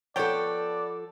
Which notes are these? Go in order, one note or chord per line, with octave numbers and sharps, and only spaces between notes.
F3 B3 A4 C#5 D5 G5